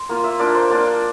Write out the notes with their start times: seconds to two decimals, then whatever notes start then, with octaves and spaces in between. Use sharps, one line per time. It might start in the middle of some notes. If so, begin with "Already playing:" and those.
Already playing: C6
0.09 A#3 F4
0.24 E5
0.39 A#3 D4 F4 D5
0.55 C5
0.70 A#3 D4 F4 D5